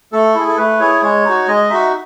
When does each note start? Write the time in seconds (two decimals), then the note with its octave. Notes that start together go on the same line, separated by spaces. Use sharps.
0.13 A3 A4
0.35 E4 G#4
0.48 A4
0.57 A3 B4
0.80 E4 G#4 C#5
1.02 G#3 C#5
1.25 D#4 F#4
1.47 G#3 D#5
1.70 D#4 F#4 E5